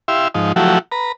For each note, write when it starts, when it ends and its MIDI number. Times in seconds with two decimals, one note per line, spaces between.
0.08 0.28 64
0.08 0.28 67
0.08 0.28 76
0.08 0.28 77
0.08 0.28 84
0.34 0.52 44
0.34 0.52 53
0.34 0.52 63
0.56 0.79 53
0.56 0.79 54
0.56 0.79 57
0.56 0.79 64
0.56 0.79 66
0.56 0.79 67
0.92 1.12 71
0.92 1.12 82